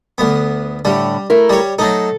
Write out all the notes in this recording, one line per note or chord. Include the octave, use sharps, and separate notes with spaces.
D2 B3
A2 D3 G3
A3 E4 A#4
G3 C#5
F#3 A3 D#4 A4